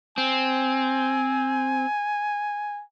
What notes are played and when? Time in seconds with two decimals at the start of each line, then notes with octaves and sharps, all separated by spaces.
0.18 C4 G#5